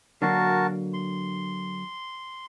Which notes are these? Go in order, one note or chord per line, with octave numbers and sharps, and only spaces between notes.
D3 F#3 A#3 F#4 A#4 A5
C6